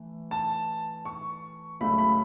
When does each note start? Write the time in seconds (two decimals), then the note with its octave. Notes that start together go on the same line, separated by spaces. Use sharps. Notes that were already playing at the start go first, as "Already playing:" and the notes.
Already playing: E3 A3
0.31 A5
1.05 C#6
1.80 C#2 C#3 F#3 A3 B5
1.98 B5